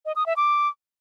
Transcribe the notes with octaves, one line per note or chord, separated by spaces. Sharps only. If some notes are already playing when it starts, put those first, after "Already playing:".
D#5
D#6
E5
D6